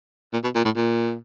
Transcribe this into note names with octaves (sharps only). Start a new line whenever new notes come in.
A#2
B2
A#2
A2
A#2